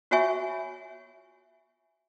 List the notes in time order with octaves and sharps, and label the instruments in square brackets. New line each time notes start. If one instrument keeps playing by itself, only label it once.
[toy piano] F4 F#4 C#5 E5 G#5 C#6